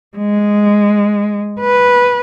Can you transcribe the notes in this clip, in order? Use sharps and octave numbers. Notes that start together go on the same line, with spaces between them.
G#3
B4